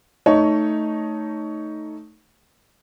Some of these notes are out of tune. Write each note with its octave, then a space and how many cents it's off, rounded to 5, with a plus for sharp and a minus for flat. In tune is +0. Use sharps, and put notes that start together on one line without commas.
A3 +5 D#4 +0 C#5 +15